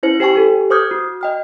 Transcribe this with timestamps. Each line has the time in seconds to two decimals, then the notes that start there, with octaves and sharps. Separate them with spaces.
0.03 C#4 E4 C5
0.20 G4 C5 G5 G#5 C#6
0.35 G4 A4
0.70 C5 D6 D#6 F6 G6 G#6
0.91 F#4
1.21 D#5 G5 F6